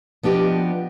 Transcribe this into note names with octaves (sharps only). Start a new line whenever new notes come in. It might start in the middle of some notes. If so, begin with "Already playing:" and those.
F3 B3 D4 G4 D#5